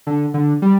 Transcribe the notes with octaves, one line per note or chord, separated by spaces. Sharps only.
D3
D3
G3